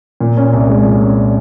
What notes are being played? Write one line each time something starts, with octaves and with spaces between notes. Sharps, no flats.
A#2
C#4
C2
G#3
A#2
C#4